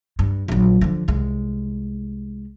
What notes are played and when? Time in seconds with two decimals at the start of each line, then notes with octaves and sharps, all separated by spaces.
0.19 G2
0.48 A#1 F#3
0.81 D3 F3
1.08 C2 G#3